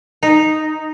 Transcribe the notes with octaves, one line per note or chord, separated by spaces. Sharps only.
D#4